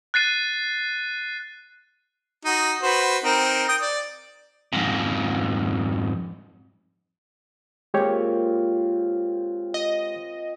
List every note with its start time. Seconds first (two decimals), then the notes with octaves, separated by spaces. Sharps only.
0.14 F#6 A6 C7 D#7
2.45 D#4 F#4
2.82 F#4 B4 C5
3.24 C4 D#4 A#4
3.69 G5 D#6
3.81 D5
4.73 F2 G#2
7.94 A#2 G#3 C4 G4 C#5
9.74 D#5